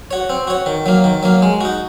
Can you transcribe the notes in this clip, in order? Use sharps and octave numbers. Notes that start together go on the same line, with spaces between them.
F#4 C#5
C4
F#4 C#5
D#3
F#3 A#3
D#3
F#3 A#3
G#3
D#4 F#4